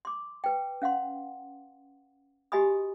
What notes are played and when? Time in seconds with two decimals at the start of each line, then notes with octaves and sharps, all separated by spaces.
0.05 C6 D6
0.44 B4 G5
0.82 C#4 F5 F#5 C6
2.52 F#4 G4 D#5 G#5 B5 D#6